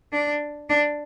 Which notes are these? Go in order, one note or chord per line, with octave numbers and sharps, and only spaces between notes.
D4
D4